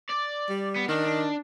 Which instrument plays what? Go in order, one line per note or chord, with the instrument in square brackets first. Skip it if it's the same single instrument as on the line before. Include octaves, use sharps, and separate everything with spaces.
[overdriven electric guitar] D5
[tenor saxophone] G3
[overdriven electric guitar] B3
[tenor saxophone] D#3 [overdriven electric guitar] D4
[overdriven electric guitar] D4